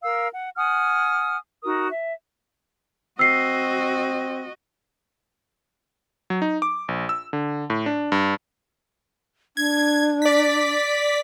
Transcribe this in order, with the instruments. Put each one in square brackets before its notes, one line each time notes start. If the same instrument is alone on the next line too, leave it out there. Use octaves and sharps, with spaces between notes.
[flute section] A#4 F5 E6
F#5
F#5 G#5 D#6 F6
D#4 F#4 A#4 D#6
E5
[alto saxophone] C4 [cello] F#4 D#5 [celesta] E6 C7
[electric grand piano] F#3
D#4
D6
A#1
E6
D3
A2
D4
G2
[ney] D4 [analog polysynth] G#6
[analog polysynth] D5 B6